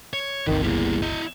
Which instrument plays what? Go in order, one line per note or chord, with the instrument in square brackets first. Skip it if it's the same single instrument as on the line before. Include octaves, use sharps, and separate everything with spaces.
[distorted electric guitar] C#5
[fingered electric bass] G1 C#2 [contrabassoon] D#3 [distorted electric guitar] E3 C4
[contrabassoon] E2 [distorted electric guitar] G3 A#3
[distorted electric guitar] E4 D#5